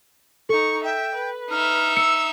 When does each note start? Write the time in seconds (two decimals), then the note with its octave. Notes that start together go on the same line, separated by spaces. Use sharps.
0.49 D#4 A4 C#6
0.83 E5 G5
1.15 B4
1.50 D#4 E5 F6
1.97 E6 C#7